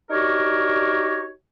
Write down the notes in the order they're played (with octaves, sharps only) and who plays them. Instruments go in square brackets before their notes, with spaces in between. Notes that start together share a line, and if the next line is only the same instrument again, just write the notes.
[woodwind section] D4 D#4 F#4 G4 A#4 C#5